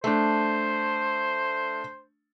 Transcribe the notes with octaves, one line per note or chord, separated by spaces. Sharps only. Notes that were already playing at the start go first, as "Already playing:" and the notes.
A3 D4 C5